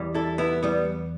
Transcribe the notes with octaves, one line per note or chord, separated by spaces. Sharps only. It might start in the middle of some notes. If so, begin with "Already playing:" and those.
Already playing: E2 E3 G3
E4 A4
B3 E4
G3 B3